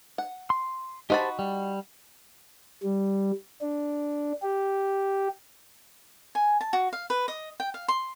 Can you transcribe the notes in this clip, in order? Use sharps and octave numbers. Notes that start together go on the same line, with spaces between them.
F#5
C6
D#4 F#4 G4 C5 A5 B5
G3
G3
D4
G4
G#5
A5
F#4
F5
B4
D#5
G5
F5
C6